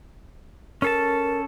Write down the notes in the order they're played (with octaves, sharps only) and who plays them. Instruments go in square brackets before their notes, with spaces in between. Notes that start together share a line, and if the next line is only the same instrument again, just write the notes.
[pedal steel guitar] C#4 A4 A5 [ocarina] A#4